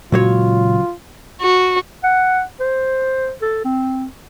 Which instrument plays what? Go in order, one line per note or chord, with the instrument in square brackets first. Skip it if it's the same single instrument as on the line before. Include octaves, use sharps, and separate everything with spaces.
[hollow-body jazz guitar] C#2 F#3 C#5 [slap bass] A#2 G#3 [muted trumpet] F4
[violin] F#4
[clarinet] F#5
C5
A4
C4